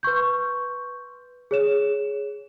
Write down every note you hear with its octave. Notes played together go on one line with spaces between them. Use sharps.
B4 C6 C#6 G6
G#4 C#5 E7